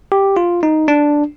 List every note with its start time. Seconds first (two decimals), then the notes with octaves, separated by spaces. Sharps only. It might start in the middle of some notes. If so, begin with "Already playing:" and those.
0.12 G4
0.37 F4
0.63 D#4
0.88 D4